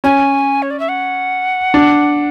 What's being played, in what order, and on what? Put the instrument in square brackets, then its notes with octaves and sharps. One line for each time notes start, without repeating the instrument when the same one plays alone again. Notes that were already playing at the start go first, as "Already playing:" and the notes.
[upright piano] C#4 [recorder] G#5
[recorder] C#5
D5
E5
F#5
[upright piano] D4